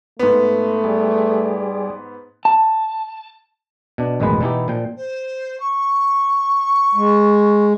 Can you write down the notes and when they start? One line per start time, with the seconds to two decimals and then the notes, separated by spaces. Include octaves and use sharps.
0.19 G#2 A3 B3
0.84 G3 G#4 D5
2.45 A5
3.98 B2 D4
4.20 A1 F#2 B2 D#3 G#3 B4
4.41 B2 E3 D#4 E4 G4
4.68 A#2 F3 G5
4.97 C5
5.59 C#6
6.95 G#3